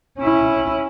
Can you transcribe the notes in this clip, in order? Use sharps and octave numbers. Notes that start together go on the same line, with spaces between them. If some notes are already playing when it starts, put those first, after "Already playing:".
C#4 E4